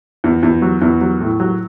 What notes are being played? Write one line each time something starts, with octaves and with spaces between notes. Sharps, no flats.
E2
E2
F#3
E2
F#3
A2
F#3